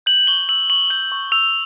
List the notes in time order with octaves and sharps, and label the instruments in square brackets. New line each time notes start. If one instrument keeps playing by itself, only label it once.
[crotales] G6 F#7
C#6 G7
E6 F#7
C#6 F#7
G6 F#7
C#6
E6 F7